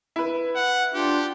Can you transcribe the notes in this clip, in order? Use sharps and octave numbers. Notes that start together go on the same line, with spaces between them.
E4 B4
F#5
D4 F4 G4